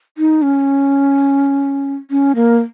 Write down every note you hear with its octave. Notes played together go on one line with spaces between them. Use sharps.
D#4
C#4
C#4
A#3